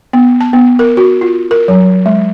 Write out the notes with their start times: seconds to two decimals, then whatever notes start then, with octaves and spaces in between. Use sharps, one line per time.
0.13 B3
0.41 A5
0.53 B3
0.79 A#4
0.97 F#4
1.21 F4
1.51 A#4
1.68 F#3
2.06 G#3